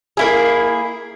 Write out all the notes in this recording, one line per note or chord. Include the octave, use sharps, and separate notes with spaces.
A#3 E4 G#4